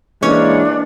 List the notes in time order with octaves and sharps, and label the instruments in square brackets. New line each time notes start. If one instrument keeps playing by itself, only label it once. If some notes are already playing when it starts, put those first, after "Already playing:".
[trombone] E3 [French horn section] G#3 A#3 [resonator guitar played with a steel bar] C#4 C#5 [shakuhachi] D4